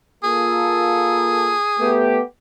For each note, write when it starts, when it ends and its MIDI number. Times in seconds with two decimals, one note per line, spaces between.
0.24 1.55 58
0.24 1.55 65
0.24 1.96 68
0.24 1.55 69
1.79 2.20 57
1.79 2.20 59
1.79 2.20 67